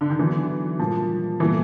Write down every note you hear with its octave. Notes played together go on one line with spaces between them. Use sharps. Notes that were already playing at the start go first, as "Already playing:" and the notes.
D3
D#3
D3 E3 F#3 B3 D4
A#2 F3 G3 A#3
A#2 E3 G3 B3 E4 A4